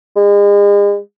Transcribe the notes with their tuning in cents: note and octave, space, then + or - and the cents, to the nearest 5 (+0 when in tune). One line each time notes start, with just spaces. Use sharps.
G#3 -40